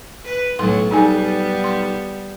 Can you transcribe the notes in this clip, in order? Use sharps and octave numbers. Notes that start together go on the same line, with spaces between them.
B4
B1 A2 F#3 C6
G3 B3 D#4 G#4 G#5
C6